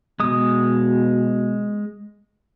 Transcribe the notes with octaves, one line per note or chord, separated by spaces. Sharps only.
B2 G#3 D#6